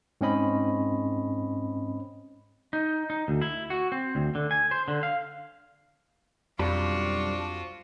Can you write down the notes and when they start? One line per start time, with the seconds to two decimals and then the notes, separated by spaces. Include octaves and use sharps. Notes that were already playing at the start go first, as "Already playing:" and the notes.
0.21 G#2 C4 C#4 D#5 B5
2.73 D#4
3.10 D#4
3.28 D2
3.42 E4
3.70 F#4
3.92 C4
4.15 D2
4.35 D3
4.51 G#5
4.71 C5
4.88 D3
5.03 F5
6.59 B1 F2 G3 D4 F4 F#4 B5